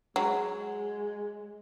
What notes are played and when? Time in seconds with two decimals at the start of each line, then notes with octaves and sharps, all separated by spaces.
0.16 F#3 G#3